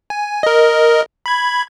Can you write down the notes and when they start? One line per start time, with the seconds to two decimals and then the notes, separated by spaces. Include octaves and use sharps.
0.10 G#5
0.43 A#4 D#5
1.26 B5 G#6